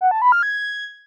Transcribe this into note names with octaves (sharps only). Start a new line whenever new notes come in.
F#5
A5
B5
F6
G#6